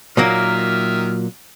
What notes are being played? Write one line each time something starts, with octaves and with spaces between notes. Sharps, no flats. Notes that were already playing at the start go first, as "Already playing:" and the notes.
A#2 D#3 F#3 A#3 E5 F6